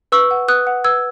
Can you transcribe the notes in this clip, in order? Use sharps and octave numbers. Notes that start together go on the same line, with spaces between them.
B4 C#6 E6
F#5
B4 D#6 F#6
F#5
B4 E6 G#6